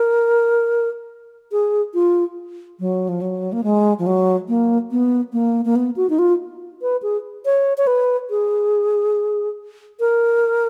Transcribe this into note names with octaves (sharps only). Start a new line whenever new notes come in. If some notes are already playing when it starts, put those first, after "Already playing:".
Already playing: A#4
G#4
F4
F#3
F3
F#3
A#3
G#3
F3
F#3
A#3
B3
A#3
A#3
B3
F#4
D#4
F4
B4
G#4
C#5
C#5
B4
G#4
A#4